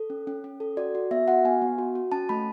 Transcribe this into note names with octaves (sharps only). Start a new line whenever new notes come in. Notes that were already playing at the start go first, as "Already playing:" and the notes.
Already playing: A4
C#4
C#4
C#4
A4
F#4 D5
F#4
B3 E5
F#4 F#5
B3 G#5
B3
F#4
F#4
C#4 A5
A3 B5